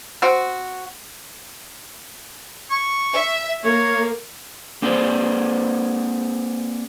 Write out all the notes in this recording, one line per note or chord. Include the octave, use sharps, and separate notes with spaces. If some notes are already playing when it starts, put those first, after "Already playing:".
C4 F#4
C#6
E5
A#3 C#5
A#3 C4 G#4 C5 D5